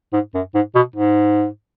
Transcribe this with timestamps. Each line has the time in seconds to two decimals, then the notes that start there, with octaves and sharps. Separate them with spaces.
0.13 G#2
0.34 F#2
0.55 G#2
0.75 B2
0.96 G#2